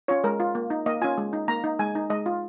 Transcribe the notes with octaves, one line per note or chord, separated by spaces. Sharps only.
C#4 F4 C#5
G#3 A#4
F4
A#3
D#4
A#3 D#5
C#4 F4 G#5
G#3
D#4
A#3 A#5
D#4
G#3 G#5
D#4
G#3 D#5
F4